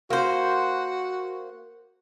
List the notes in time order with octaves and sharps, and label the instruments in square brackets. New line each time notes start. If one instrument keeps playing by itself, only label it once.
[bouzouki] A#3 C5 [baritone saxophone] F#4